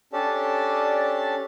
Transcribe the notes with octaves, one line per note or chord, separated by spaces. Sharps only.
C#4 D4 G4 A4 D5 A5